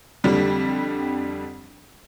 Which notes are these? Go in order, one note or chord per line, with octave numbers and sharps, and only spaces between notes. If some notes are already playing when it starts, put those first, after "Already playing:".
F2 D3 G3